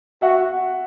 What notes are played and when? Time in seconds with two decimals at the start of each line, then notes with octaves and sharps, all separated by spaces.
0.22 F#4 E5 F#5